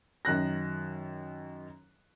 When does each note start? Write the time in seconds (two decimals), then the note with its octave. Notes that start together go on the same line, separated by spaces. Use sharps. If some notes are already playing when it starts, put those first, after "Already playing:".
0.25 F#2 D#3 F#6 A#6